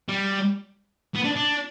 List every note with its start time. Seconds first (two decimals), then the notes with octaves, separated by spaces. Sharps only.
0.09 G3
1.15 B3
1.24 D4
1.36 D4